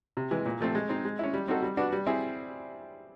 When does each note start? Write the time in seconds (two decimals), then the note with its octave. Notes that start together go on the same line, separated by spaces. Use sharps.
0.17 C3
0.31 E3 G#3
0.46 A#2
0.60 F3 A3 C4
0.75 G#3
0.89 C4 D#4
1.05 G#3
1.19 C#4 E4
1.34 G3
1.48 C4 D#4 F#4 A4
1.62 G3
1.77 B3 D4 F#4
1.92 G3
2.06 C4 E4 G#4